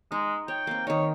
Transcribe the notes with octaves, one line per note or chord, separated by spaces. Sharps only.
G#3 D#4
C#5 G5
A#3 C4
D#3 D#4 C#5